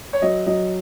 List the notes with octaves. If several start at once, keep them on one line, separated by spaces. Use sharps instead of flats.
C#5
F#3 D#5
F#3 D#5